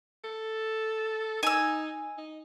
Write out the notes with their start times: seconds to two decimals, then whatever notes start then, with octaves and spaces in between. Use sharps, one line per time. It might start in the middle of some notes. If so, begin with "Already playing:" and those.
0.24 A4
1.43 D#4 G#5 E6
2.18 D#4